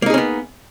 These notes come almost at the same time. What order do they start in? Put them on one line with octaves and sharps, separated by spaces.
A#3 D#4 G#4 C#4 B3